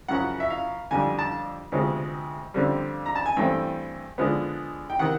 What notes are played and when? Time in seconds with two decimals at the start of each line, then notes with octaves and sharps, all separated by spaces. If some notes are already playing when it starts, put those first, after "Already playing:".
0.08 F#2 C#3 F3 F#5
0.40 E5
0.50 F5
0.91 F2 D3 G3 G#5
1.19 A5
1.72 D2 C3 F3 G#3 B3
2.54 F2 D3 G3 C4
3.06 A#5
3.15 A5
3.26 G#5
3.36 G2 E3 A3 C4 G5
4.18 D3 F3 G#3 B3
4.90 G5
4.99 C3 D#3 F#5